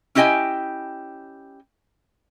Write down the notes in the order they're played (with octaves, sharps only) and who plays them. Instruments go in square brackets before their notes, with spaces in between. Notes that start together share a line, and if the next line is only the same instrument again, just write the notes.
[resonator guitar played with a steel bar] C#4 E4 G4 D#5 G5 G#5